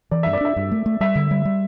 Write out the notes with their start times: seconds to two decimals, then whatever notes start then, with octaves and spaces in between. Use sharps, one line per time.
0.11 E3 D5
0.23 G2 E5
0.33 D5
0.41 D4 E5
0.56 G2
0.71 A3
0.86 A3
1.01 G3 E5
1.16 D3
1.31 G3
1.45 G3